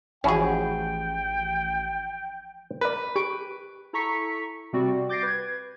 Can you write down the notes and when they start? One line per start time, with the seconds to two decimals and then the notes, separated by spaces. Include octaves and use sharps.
0.24 A1 F3 C#4 E4 F#4 G#4 G5
2.81 A#4 B4 D5
3.16 G4 C#6 D7
3.93 E4 A4 A#5 C#6 B6 C#7
4.73 C3 G3 C4 F#4 D5
5.09 D6 G6 A6 A#6 C7 D7
5.23 B4 G#6